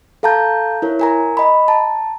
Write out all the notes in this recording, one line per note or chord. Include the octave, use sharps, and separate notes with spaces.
A4 F5 A5 A#5 G6
E4 A#4 C#5
A#4 G#5 A#5
D#5 B5
A5 A#5